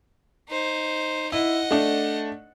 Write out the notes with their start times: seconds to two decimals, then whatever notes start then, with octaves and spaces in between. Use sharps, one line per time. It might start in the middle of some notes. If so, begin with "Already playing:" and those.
0.49 D#4 C5
1.32 E4 D#5 F#5
1.71 A3 D4